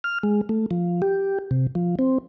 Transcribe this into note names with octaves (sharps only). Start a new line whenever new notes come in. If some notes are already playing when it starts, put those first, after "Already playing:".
F6
G#3
A3
F3
G4
C3
F3
C4